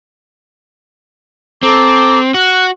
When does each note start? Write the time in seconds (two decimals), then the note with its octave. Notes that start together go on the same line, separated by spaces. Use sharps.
1.63 C4 A4 A#5 D6
2.34 F#4 F#6